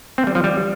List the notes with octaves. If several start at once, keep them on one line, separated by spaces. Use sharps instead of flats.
C4
G3
F3
G3